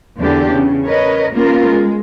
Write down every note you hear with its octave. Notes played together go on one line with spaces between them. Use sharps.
E2 D3 D4 G4
C#3
A#4 B4 C#5 D#5
A#3 B3 C#4 F4 A#4
G#3